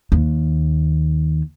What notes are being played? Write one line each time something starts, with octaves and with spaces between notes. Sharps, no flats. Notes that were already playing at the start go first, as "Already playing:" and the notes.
D#2